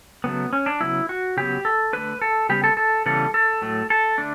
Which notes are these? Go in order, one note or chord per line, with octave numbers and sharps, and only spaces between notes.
C#3 F#3 A3 B3
C#4
D4
C#3 F#3 B3 E4
F#4
C#3 F#3 B3 G4
A4
D3 A3 B4
A4
C#3 G3 B3 G4
A4
A4
C#3 E3 G3 B3 A4
A4
A2 F#3 A3
A4
D3 A3 D4